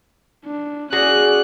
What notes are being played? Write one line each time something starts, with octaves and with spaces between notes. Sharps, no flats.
D4
C#4 F#4 G#4 D5 F#6